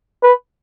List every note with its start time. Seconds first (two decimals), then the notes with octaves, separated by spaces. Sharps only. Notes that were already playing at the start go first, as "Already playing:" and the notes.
0.23 B4